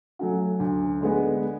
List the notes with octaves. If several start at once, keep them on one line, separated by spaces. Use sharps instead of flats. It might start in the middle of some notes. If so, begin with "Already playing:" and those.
F#3 A3 C#4 F#4
D2
D3 G#3 B3